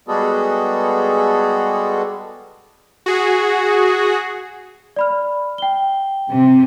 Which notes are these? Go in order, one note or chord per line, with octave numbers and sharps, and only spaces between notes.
G3 G#3 B3 F#4 G#4 A4
F#4 G#4
D5 B5 F6
G5 G7
C3